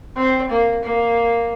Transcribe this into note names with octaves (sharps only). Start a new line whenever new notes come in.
C4
A#3
A#3